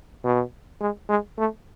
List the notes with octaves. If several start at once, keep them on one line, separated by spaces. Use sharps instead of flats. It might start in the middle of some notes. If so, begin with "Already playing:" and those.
B2
G#3
G#3
A3